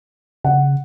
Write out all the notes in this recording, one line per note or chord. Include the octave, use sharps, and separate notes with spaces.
C#3 F#5